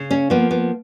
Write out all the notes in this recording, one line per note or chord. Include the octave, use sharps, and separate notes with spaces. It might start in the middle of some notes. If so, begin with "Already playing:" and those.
Already playing: C#3
C#4
F3 A#3 B3
B3